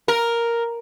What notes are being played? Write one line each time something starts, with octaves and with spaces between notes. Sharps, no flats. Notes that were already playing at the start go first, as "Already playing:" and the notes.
A#4